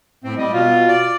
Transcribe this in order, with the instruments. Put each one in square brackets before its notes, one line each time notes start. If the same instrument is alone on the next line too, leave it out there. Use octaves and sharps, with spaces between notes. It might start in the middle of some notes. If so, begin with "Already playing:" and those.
[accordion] A2 C4
[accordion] G3 [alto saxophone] D#5
[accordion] B2 [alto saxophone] F4
[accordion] D5